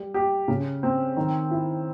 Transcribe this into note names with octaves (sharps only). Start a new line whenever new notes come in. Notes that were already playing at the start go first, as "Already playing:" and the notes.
Already playing: G3
G4
C#3
C4
D#3
E4